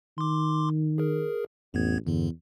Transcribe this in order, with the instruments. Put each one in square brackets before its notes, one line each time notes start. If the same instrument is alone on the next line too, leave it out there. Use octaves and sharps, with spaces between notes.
[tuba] D#3 [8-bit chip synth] C6 D6
[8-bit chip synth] G#4 A#4
[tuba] A1 [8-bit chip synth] F2 B3 G#6
[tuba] E2 [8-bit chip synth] G2 D3